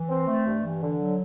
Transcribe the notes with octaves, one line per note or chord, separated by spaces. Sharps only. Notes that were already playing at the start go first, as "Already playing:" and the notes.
Already playing: E3
C4
A3
G2
E3
D3
F#3